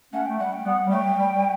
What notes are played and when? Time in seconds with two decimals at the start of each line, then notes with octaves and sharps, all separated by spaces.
0.13 A3 C#4 F#5
0.26 A3 G5
0.39 G3 F#5
0.53 G5
0.65 G3 B3 F#5
0.87 G3
0.91 F#3 A3 G5
1.17 G3
1.34 G3